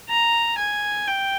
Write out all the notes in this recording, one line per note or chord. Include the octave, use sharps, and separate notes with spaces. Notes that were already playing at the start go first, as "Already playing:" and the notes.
A#5
G#5
G5